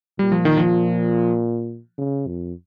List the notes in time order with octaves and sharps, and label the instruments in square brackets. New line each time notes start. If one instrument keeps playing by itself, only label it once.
[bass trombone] A#2 [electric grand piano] G3
[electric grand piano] F3
D#3
F3
[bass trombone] C#3
F2